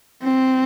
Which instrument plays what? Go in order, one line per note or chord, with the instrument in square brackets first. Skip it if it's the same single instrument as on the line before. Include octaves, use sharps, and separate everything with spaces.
[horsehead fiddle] C4